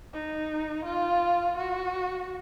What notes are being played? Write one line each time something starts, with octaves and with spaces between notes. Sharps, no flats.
D#4
F4
F#4